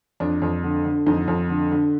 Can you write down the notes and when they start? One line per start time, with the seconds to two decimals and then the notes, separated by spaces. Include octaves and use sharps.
0.20 F2 D4
0.42 F2
0.64 D3
0.85 D3
1.06 F2 D#4
1.28 F2
1.50 D3
1.71 D3